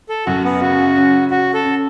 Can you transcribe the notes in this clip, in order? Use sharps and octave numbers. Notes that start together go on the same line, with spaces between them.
A4
F#2 F#4
B3
C#3 F#4
C#4
C#4 F#4
A4
C#4